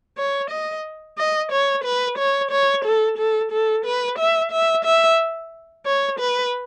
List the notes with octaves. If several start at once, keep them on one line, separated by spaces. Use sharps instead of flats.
C#5
D#5
D#5
C#5
B4
C#5
C#5
A4
A4
A4
B4
E5
E5
E5
C#5
B4